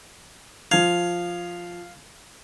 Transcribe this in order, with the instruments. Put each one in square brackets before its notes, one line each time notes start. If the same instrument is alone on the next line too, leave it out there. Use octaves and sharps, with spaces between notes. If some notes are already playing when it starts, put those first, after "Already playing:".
[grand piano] F3 G#6 [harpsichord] F5